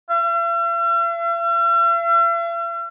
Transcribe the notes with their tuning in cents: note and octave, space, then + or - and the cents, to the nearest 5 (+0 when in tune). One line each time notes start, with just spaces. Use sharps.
E5 +45